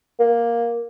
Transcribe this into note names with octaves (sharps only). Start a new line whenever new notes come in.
A#3